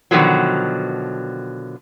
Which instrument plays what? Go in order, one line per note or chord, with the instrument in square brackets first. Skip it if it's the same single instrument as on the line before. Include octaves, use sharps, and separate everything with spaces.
[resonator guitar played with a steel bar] B2 D3 D#3 F3 F#3